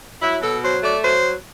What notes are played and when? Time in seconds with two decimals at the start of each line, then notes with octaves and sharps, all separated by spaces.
0.21 F#3 E4
0.42 B2 A4
0.63 F#3 C5
0.84 A3 D5
1.03 F#3 C5